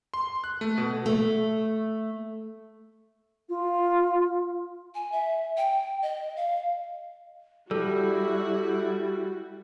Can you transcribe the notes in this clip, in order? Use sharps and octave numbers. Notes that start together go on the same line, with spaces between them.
C6
F#6
A3
B2
A3
F4
G#5
E5
G5
D#5
F5
G3 E4 F#4 A4